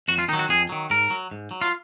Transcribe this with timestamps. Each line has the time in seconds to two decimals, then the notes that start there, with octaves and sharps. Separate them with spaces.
0.08 F2 F#4
0.19 F4
0.28 D#3 D#4
0.33 F#3
0.39 F#4
0.49 F2 G#4
0.69 D#3 F#3
0.90 G#2 A#4
1.10 F#3
1.31 G#2
1.51 F#3
1.61 F4